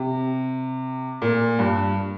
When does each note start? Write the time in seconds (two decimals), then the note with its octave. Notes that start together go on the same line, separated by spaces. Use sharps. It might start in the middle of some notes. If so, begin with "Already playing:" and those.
Already playing: C3
1.22 A#2
1.59 G2